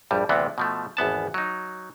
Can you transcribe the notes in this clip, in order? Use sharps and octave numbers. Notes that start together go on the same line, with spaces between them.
A#1 G2 G3
D2 C3 E3 B3
B2 F3 A3
G#1 E2 B3 A5
F#3 D#4